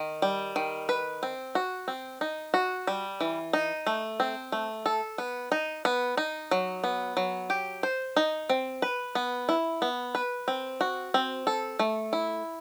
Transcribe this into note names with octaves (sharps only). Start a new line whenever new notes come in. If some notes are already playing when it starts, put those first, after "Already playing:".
Already playing: D#3
G3
D#3
B4
C4
F#4
C4
D#4
F#4
G3
E3
D#4
A3
C4
A3
A4
B3
D#4
B3
D#4
F#3
B3
F#3
G4
C5
D#4
C4
B4
B3
E4
B3
B4
C4
F#4
C4
A4
A3
E4